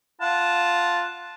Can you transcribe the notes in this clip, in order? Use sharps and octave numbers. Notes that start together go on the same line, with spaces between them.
F4 F#5 A5